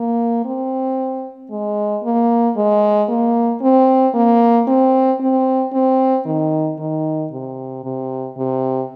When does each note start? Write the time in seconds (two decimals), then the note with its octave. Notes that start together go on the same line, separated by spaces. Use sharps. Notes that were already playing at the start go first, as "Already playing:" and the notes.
Already playing: A#3
0.45 C4
1.50 G#3
2.03 A#3
2.57 G#3
3.09 A#3
3.62 C4
4.14 A#3
4.67 C4
5.21 C4
5.73 C4
6.26 D#3
6.79 D#3
7.32 C3
7.84 C3
8.37 C3